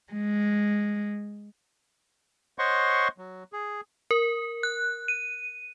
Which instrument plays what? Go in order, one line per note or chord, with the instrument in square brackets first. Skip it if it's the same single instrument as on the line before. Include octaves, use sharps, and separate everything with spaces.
[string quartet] G#3
[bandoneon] C5 C#5 D#5 F#5 C6 C#6
F#3
G#4
[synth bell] A#4
F#6
D#7